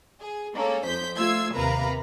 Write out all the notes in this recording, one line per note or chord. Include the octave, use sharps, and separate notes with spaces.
G#4
G#3 A#3 C#4 A4
F2 C5 G6 B6
A3 F4 E6 G#6 C7
D#2 C3 A#4 B4 F5 A#5